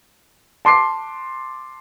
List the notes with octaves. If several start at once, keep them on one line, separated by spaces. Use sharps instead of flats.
A5 C6 D6 C7